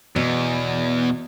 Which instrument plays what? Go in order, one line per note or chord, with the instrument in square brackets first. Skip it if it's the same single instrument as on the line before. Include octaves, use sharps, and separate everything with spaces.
[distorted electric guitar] E2 [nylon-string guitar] B2